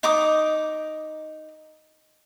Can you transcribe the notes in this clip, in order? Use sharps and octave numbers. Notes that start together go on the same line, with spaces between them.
D#4 D6 D#6